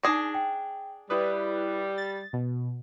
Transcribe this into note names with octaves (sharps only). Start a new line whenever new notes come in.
D4 D#4 G#4 D5 A#6
G5
G3 E4 B4 D#6
A6
B2